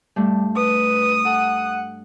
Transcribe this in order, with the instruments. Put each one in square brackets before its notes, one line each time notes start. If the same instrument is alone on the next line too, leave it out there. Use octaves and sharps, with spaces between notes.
[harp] G2 A3 D4 [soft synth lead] G3
[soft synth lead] B4 [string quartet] D#6
[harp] A4 [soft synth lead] F#5